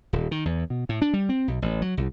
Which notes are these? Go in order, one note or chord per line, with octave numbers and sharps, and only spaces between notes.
D#1
D#3
E2
B2
A2
D4
G3
C4
B1
A1
F#3
C2